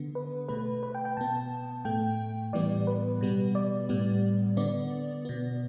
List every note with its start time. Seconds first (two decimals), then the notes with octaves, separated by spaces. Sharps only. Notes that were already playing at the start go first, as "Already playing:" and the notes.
Already playing: D3 B3
0.15 B4
0.48 B2 A3 B4
0.83 B4
0.95 G5
1.05 G5
1.17 B2 B3 A5
1.85 A2 A3 G5
2.53 A2 E3 G3 B3 D5
2.87 B4
3.21 B2 G3 B3
3.55 D5
3.89 A2 G3 B3
4.57 D3 B3 D5
5.25 B2 B3